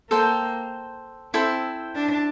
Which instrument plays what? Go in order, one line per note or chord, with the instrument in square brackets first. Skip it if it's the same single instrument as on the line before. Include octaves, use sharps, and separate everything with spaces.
[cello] A#3 [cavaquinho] A4 C5 G5
[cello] C4 [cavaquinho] E4 A4 C5 G5
[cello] D4